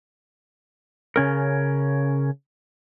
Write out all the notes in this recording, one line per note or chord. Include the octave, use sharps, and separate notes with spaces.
C#3 C#4 A#4